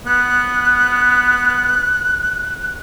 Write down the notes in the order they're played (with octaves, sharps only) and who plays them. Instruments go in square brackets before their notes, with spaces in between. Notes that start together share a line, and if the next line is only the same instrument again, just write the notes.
[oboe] B3 [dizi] F#6